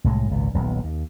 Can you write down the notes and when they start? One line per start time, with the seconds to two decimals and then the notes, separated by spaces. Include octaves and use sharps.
0.04 C2 A2 G#3
0.30 G#1 C#2 A#2
0.54 D#1 B1
0.84 D#2